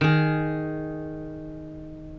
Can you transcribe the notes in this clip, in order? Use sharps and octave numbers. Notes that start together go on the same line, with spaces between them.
D#3 G#4